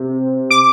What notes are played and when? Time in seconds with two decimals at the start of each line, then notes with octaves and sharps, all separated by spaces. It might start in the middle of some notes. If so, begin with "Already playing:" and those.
Already playing: C3
0.51 D6